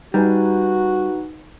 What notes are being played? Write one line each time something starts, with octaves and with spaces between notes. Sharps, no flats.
G3 D#4 F#4 B4 G#5